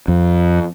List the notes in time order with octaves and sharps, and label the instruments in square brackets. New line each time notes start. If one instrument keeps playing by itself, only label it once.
[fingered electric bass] F2